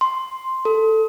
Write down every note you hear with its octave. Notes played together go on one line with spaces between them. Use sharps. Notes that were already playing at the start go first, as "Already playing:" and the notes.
C6
A4